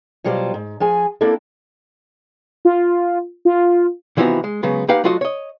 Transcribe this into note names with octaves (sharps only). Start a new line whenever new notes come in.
B2 F#3 G3 F4 C5
G#2
F3 G#4 G#5
A#3 C4 D4 E4 A4
F4
F4
C3 E3 F3 B3 D#4 F#4
G#3
C#3 F#3 G#3 B3
A#3 D#4 G4 B4 F5 F#5
F#3 A3 F4 F#4 D#5
C#5 D#5